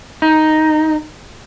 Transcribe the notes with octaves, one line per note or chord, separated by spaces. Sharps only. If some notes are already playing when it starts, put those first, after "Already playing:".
D#4